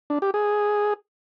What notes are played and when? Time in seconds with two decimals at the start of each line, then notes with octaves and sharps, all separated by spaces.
0.10 D4
0.22 G4
0.34 G#4